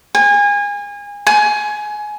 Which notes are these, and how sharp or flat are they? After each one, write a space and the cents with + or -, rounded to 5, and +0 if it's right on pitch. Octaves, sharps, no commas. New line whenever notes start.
G#5 -30
G#5 +20